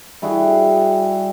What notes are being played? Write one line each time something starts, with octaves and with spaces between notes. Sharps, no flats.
G3 E4 F#4 G#4